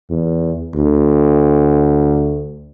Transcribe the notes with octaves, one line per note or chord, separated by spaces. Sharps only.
E2
D2